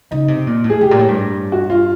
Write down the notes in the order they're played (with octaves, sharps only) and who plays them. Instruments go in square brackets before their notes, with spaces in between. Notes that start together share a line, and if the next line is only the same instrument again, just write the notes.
[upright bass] C#3 [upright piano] D#4
[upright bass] C3
A#2
A2
[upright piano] G#4
[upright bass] A2 [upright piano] G4
[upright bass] A#2
A2
G2
[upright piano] F#4
F4